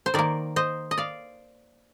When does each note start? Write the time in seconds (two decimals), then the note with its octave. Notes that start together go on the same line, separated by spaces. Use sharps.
0.06 C5
0.14 D#3 A#3 A#4 D5
0.56 C5 D#5
0.91 D#5
0.98 D5 F5